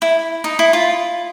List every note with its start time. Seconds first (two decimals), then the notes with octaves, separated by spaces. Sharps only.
0.02 E4
0.44 D#4
0.59 E4
0.73 F4